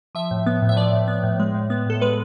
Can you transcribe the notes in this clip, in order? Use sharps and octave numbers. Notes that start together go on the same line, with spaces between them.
F3 E5
A2
B3
A2
E5
F3 D5
A2
B3
A2
G#3
A2
B3
A2 A4
G#3 B4